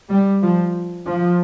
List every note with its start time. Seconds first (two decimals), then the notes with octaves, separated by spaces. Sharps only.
0.09 G3
0.42 F3
1.05 F3